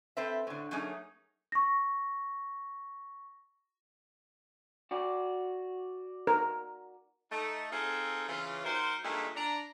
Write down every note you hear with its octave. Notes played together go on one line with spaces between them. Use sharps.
C4 A4 B4 C5 E5
A2 D3
F#3 A3 A#3 C#4 D#4 G#4
C#6 A#6
F#4 D5
A#4
A3 D#4
C4 D#4 F4 G#4 A4
C#3 E3 F4
F#3 D#4 A#4 C5
G2 A#2 G#3 A3 D#4 E4
D4 A#5